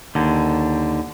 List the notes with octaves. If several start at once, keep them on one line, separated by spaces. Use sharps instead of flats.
D#2 D3